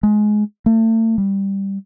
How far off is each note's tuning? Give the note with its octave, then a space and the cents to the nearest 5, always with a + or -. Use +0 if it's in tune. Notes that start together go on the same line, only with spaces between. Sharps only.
G#3 +20
A3 +35
G3 +5